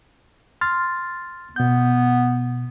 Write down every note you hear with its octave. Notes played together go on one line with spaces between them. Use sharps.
C6 F6 A6
B2 B3 G6